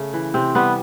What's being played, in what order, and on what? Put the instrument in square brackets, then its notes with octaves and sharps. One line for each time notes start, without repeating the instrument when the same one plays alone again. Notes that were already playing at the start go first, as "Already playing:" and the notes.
Already playing: [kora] C#3 A3
E3
C3 C4
G3 B3